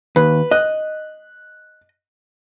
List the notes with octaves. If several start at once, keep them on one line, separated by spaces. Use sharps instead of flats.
D#2 B4
D#5 F#6